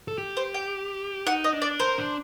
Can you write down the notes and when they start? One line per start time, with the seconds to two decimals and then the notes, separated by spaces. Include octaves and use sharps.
0.08 A4
0.18 G4
0.37 C5
0.54 G5
1.27 D#4 F#5
1.44 D#5
1.53 D4
1.62 D5
1.80 A#4 C5
1.98 D4